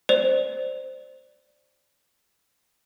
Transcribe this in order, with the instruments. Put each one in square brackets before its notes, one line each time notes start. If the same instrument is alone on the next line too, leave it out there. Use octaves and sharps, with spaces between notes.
[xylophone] C5 D5 F7